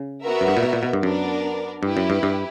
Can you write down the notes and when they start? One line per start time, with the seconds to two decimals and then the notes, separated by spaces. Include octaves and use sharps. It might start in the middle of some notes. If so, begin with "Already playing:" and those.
Already playing: C#3
0.24 B3 F#4 A#4 E5
0.41 F#2
0.48 G2
0.57 A#2
0.63 B2
0.73 A#2
0.83 B2
0.93 G2
1.03 F#2 B3 D4 A#4 D5
1.83 G2 E4 G4 B4
1.97 F#2
2.10 G2
2.23 G2